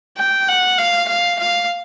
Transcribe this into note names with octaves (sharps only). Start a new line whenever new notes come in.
G5
F#5
F5
F5
F5